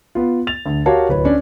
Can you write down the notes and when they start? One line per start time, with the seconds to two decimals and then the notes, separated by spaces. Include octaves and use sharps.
0.15 B3 F4
0.47 A6 F7
0.66 D2
0.86 F#4 G4 A#4 C#5 F5 A5
1.09 D1 B4 C#5
1.25 C#4 D4